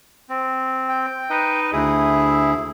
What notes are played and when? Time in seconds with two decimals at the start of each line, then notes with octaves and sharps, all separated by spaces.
0.29 C4
0.89 G5
1.30 D#4 B4 D#5
1.73 D2 E4 G#4